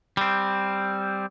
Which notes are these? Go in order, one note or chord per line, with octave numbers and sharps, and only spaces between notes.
G3 C4